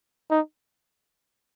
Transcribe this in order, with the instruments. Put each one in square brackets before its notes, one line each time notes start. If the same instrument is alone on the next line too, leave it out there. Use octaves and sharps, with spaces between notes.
[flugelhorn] D#4